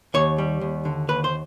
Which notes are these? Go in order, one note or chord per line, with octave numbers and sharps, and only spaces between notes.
D#2 C#5
G3
D#2
D3
D#2 B4
C5